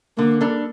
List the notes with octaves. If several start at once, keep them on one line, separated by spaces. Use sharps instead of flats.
D3 A#3
G3 D4 A4